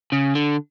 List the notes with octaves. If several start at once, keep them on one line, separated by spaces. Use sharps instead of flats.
C#3
D3